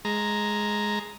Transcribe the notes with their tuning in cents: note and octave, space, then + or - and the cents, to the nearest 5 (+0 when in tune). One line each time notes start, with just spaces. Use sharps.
G#3 +5 A#5 +0